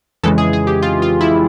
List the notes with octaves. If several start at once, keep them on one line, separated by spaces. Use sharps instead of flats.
F2 C#3 E3 G#3 A4
G#4
G#4
G4
F4
F4
E4